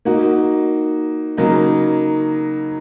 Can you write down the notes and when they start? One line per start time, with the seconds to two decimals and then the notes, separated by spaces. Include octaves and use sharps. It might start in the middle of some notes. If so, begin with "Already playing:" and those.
0.05 A#3 D#4 F#4
1.37 C#3 F#3 A#3 D#4